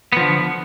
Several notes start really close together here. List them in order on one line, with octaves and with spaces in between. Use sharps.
B3 F3 D3